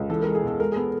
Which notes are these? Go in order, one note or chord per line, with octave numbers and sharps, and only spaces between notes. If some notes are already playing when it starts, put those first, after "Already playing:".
Already playing: C#2
E3 A4
A#4
G#3
G#4
E2 A4
G#3 A#4
G#4
B3 A4